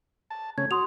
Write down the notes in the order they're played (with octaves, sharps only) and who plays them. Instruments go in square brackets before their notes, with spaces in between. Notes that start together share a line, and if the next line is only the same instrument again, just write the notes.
[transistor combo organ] A5
[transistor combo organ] C#3 A3 C#4 [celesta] G#6
[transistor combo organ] F#4 [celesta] C6 D#6 F7